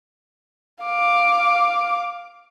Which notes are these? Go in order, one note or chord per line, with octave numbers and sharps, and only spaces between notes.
F5 D6